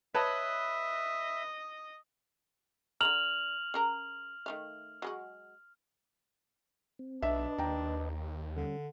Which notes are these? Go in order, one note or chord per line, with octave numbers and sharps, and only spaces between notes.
B4 C#5 D#5 E5 A5
D3 D5 A#5 F6 F7 F#7
C#3 A#4 A#5
D#3 A3 F5
F#3 G#3 F#4
C4
B1 D4 B4 D#5 E5
D#2 G5 A#5
D3 G3 C#4